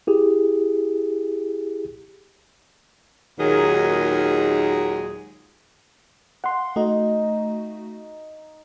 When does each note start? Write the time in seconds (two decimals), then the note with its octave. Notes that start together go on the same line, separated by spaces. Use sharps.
0.07 E4 G4 G#4
3.40 D#2 A#2 D#3 F#3 G#3 G#4
6.44 F5 F#5 C6
6.76 A3 D#4 F#4